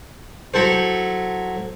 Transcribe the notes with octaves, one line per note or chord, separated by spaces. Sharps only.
F#3 E4 A4 C5